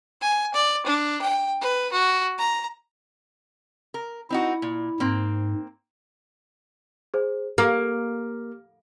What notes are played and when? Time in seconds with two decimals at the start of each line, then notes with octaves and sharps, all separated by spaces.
0.21 G#5
0.54 D5
0.86 D4
1.21 G5
1.61 B4
1.92 F#4
2.38 A#5
3.94 A#4
4.30 C4 D#4 E4 F#4
4.62 A#2
5.00 G#2 A#3 C4
7.14 G#4 C5
7.58 A#3 G4 D6 F6